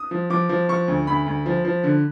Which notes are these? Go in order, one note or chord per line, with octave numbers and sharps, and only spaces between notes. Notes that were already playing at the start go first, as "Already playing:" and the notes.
Already playing: D#6
F3
F3 D6
F3
F3 C#6
D2
D2 B5
D2
F3
F3
D3